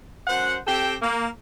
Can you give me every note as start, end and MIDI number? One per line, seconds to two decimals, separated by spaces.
0.27 0.56 42
0.27 0.56 72
0.27 0.56 78
0.67 0.94 60
0.67 0.94 67
0.67 0.94 69
0.67 0.94 79
1.01 1.26 58